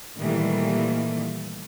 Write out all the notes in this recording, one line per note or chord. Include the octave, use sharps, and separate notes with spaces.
A#2 D#3 E3 G3 A3 A#3